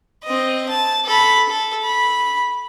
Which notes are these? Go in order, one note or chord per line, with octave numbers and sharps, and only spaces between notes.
C4 D#5
A5
A4 B5
A4
B5